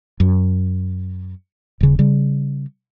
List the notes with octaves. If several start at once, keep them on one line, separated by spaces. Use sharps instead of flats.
F#2
D#1 C#3
C#3 G3